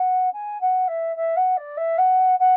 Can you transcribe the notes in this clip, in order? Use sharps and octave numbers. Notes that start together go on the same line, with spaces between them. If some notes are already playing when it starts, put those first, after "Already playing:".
Already playing: F#5
G#5
F#5
E5
E5
F#5
D5
E5
F#5
F#5